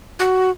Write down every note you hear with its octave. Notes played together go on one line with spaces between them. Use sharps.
F#4